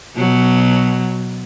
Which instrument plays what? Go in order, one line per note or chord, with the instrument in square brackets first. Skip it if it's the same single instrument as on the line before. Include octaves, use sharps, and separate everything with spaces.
[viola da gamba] B2 F#3